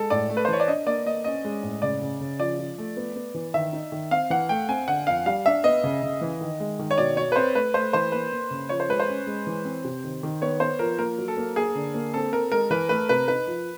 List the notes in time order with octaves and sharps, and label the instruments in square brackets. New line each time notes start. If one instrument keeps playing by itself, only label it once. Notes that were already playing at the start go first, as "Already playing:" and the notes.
Already playing: [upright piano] G#3 [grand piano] A4
[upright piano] A2 [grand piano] D5
[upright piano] A3
[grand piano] B4
C5
[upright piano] E3 [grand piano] C#5
[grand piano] D5
[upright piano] D4 [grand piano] D#5
[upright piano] A#3 [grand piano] D5
[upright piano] A#3 [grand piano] D#5
[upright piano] C#4 [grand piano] D#5
[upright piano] G#3
A2
[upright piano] C#3 [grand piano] D5
[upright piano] C#3
C#3
[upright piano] F3 [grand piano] D5
[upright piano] F3
A3
B3
B3
E3
[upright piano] D#3 [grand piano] E5
[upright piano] D#4
D#3
[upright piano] C4 [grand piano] F5
[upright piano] E3 [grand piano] F#5
[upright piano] A3 [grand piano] G5
[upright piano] C4 [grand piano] G#5
[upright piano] D3 [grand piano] F#5
[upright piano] F2 [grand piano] F5
[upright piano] G3 [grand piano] F5
[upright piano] D4 [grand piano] E5
[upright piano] B3 [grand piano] D#5
[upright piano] C#3
C#3
E3
D#3
G#3
D#3
[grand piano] C#5
[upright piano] B2 [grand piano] D5
[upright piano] B2 [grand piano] C#5
[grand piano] B4
[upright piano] C4 [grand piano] C5
[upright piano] A3 [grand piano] B4
[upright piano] A3 [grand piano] C5
[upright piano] E3 [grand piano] C5
[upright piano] A#3 [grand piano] B4
[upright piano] A#3
C#3
[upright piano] F3 [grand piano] C#5
[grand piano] C5
[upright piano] G#3 [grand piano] B4
[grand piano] C5
[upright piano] C#4
G#3
E3
C4
C3
D#3
D#3
[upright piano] B3 [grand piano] C#5
[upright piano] B3 [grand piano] C5
[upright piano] F3 [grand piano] A#4
[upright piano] A#3 [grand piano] A#4
[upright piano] F#3
[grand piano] A4
[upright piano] A#3
[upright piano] A#3 [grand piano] G#4
[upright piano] D3
A#3
[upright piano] C4 [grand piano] A4
[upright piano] C4 [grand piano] A#4
[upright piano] G#3 [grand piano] A#4
[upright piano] E3 [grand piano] B4
[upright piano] A3 [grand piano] B4
[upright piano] C3 [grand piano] B4
[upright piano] D#4 [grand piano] B4
[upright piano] F3